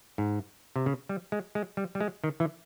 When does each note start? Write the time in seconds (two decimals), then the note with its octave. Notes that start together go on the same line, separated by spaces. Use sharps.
0.18 G#2
0.76 C3
0.86 C#3
1.09 G3
1.32 G#3
1.55 G#3
1.77 G3
1.95 G3
2.01 G#3
2.24 D#3
2.40 E3